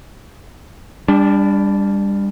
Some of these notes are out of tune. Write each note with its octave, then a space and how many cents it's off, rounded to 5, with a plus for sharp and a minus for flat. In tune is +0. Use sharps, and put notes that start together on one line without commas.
G3 +25 D4 -15